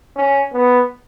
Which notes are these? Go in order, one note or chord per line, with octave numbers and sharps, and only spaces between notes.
C#4
B3